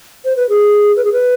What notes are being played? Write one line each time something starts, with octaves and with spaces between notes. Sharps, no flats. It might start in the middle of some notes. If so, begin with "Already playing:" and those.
C5
B4
G#4
B4
G#4
B4